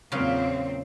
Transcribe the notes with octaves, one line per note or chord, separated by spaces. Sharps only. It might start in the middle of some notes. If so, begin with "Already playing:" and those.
E2 A#2 C#3 F#3 C4 F4